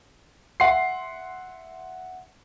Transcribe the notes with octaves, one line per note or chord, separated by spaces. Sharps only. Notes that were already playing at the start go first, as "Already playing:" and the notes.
E5 F#5 C6 C7